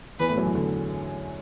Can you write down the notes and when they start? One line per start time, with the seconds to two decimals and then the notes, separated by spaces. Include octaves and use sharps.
0.19 E2 E3 B4
0.29 A2 A3
0.37 F#2 F#3
0.46 E2 E3
0.55 D3